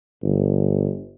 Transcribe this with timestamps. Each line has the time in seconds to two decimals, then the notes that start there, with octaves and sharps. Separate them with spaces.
0.23 G1